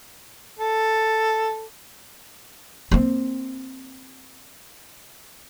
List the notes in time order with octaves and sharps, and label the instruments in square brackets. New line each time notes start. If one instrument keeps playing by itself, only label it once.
[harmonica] A4
[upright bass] A#3 C4